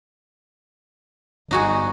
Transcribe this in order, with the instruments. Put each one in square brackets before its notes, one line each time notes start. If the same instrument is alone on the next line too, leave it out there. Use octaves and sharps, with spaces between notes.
[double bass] G1 [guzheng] D#4 F#4 G#4